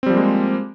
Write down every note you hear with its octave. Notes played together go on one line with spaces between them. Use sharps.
F3 G3 G#3 A#3 C4